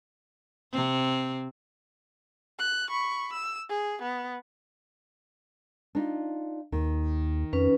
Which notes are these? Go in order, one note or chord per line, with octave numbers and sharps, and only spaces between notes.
C3 C4
F#6
B5 C#6
E6
G#4
B3
D4 D#4 F4
D#2 D#3
F2 C#4 B4